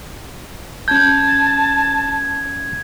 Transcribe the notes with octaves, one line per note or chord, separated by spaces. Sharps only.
C#4 A5 G6 G#6